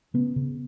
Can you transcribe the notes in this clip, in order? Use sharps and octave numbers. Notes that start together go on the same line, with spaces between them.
C#3 B3
C#3